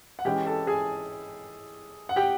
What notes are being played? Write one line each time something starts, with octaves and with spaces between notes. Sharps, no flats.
F#5
E3 G#3 C#4 E4 G4 G5
A4 A5
G#4 G#5
F#5
G4 G5